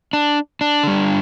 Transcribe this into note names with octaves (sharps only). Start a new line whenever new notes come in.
D4
D4
D3 G3